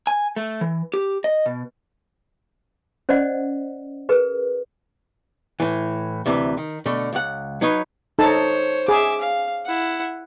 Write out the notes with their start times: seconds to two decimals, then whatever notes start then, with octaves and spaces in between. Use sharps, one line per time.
0.07 G#5
0.36 A3
0.61 E3
0.94 G4
1.24 D#5
1.46 B2
3.09 C#4 C5 D5 D#5 F#5
4.09 G#4 A#4 B4
5.60 A2 E3
6.26 D2 C3 E3
6.57 D#3
6.86 B2 D3 A3
7.13 C#2 F#5
7.61 F#3 D#4 B4 C#5
8.19 D#4 A4 C5 C#5 A5
8.88 G#4 E5 D6
9.21 F5
9.65 E4 F#5